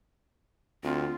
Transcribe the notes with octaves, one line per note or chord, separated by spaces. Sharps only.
D2 C4 F4